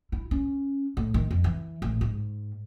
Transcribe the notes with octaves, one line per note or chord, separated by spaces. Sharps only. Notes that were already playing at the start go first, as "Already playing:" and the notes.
E4
C#4
A2
D#3
F2
E3
A1
G#2